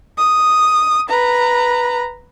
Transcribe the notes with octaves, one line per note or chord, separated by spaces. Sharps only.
D#6
B4 A#5